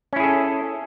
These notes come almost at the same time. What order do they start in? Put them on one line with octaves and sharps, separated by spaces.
C#4 E4 G#4 A4